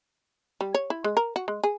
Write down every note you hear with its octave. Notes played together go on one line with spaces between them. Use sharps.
G3
C#5
E4
G#3
A#4
F#4
G#3
G#4